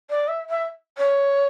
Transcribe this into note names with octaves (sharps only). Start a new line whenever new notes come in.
D5
E5
E5
C#5